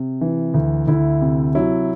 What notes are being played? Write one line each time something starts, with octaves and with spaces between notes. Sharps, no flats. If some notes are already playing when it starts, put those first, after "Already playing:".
Already playing: C3
E3
D2
D2 E4
C3
F#3 E4